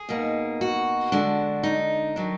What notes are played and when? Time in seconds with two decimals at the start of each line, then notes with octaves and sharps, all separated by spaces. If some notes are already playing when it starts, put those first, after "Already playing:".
Already playing: G#4
0.09 B2 A#3 D#4
0.61 F#4
1.12 D3 G#3 D4
1.63 D#4
2.16 D#3 F#3 D4